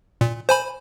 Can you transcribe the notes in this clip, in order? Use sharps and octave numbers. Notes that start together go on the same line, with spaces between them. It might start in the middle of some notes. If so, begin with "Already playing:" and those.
A#2
C5 G#5 B5